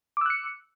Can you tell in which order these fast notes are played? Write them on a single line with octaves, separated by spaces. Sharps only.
D6 E6 F#6 C#7